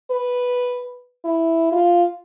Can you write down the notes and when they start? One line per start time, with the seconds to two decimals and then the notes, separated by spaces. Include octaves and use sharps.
0.11 B4
1.25 E4
1.72 F4